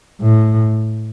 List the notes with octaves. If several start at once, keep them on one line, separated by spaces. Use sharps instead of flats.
A2